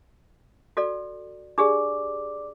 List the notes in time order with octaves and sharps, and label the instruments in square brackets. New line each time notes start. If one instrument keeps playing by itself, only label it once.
[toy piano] F#4 A4 D5
[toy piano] D4 G4 G#4 [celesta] D5 D6